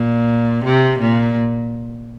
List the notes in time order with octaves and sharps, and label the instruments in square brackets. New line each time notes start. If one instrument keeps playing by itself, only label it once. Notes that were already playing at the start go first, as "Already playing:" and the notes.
Already playing: [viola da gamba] A#2
C3
A#2